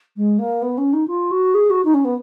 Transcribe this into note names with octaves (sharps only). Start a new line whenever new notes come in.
G#3
A#3
B3
C#4
D#4
F4
F#4
G#4
F#4
D#4
C#4
B3